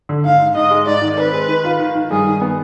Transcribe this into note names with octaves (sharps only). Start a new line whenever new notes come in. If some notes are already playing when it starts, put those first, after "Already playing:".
D3
G#2 F5
G#2
G#2 D#5
G#3
G#2 D5
D#3
C4 B4
G#3
D#3
F4
D#3
D#3
G2 G#4
D#3
B3